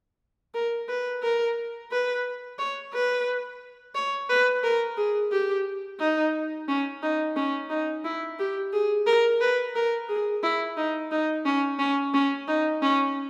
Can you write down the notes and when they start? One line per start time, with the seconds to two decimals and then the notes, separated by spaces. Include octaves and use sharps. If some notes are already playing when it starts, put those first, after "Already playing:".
0.54 A#4
0.89 B4
1.22 A#4
1.91 B4
2.59 C#5
2.93 B4
3.95 C#5
4.29 B4
4.63 A#4
4.97 G#4
5.32 G4
6.00 D#4
6.68 C#4
7.02 D#4
7.36 C#4
7.70 D#4
8.04 E4
8.39 G4
8.73 G#4
9.07 A#4
9.41 B4
9.76 A#4
10.09 G#4
10.43 E4
10.77 D#4
11.11 D#4
11.45 C#4
11.79 C#4
12.14 C#4
12.48 D#4
12.82 C#4